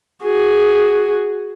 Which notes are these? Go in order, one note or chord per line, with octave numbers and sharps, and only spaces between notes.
F#4 G#4